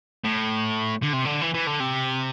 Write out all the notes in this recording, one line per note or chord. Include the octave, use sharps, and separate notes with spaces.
A2
D3
C3
D3
E3
E3
D3
C3